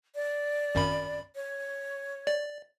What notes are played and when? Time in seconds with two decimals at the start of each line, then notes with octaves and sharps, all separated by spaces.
0.15 D5
0.75 G#1 F#2 B5
1.35 C#5
2.27 D5